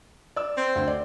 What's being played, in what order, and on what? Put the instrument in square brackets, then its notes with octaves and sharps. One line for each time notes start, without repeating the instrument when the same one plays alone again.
[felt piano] D5 E6
[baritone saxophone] C4
[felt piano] D2 C6
D5